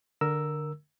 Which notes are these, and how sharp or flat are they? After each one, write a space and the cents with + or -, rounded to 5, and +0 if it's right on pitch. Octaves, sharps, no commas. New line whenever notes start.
D3 +15 A#4 +0 E6 +0